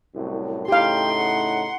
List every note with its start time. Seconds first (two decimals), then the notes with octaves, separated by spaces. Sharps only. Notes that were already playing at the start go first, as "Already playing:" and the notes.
0.14 C2 F#2 A2
0.68 A2 C#3 D#4 G4 F5 G5 C6
1.15 F#5